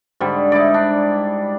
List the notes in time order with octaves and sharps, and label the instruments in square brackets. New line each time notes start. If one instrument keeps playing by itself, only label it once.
[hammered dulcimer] G#2 D3 G3
D#4 E4 D5
D4